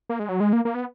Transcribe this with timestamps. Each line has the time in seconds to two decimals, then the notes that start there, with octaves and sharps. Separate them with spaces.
0.09 A#3
0.20 G#3
0.29 F#3
0.40 G#3
0.53 A#3
0.65 A#3
0.75 B3